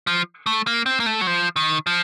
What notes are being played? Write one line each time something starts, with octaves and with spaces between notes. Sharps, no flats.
F3
A3
A#3
C4
A#3
A3
F#3
F3
D#3
F3